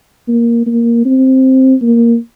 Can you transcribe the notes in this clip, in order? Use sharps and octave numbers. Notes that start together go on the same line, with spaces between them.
A#3
A#3
C4
A#3